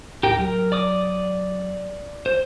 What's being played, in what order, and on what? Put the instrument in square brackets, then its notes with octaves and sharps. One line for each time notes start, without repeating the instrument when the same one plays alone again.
[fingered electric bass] D#2 A2 [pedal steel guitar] G4 A#4 G5
[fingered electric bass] F#3 [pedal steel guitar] A#4
[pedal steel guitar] D5 D6 D#6
C5